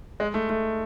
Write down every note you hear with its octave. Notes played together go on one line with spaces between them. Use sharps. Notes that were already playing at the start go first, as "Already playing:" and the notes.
G#3
A3
A3